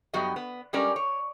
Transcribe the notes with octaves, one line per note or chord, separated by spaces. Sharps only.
G2 F#3 B3 F#4 G4 D#5
B3
G3 G#3 C#4 G4 A#4 D5
C#5